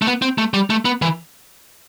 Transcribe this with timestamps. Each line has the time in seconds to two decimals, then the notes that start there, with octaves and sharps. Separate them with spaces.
0.02 A3
0.07 B3
0.22 C4
0.38 A3
0.54 G3
0.70 A3
0.85 B3
1.02 E3